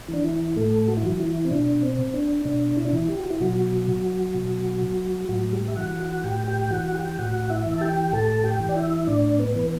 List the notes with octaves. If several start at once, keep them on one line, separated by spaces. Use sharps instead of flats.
E3 D4
E3 E4
A2 A3 A4
F#4
E4
E3 F#3 F#4
E3 E4
C4
B2 D4
C4
D4
B2 D4
E4
D4
E3 E4
G4
F#4
E4
B2 F#3 F#4
B2
A2 F#3 F#4
G3 G4
E5
E3 F#4 F#5
F#4 F#5
A2 G4 G5
G4 G5
E3 F#4 F#5
G4 G5
A2 F#4 F#5
E4 E5
E3
A5
G4 G5
A2 A4 A5
G4 G5
E3
D5
E4 E5
A2 D4 D5
B3 B4
E3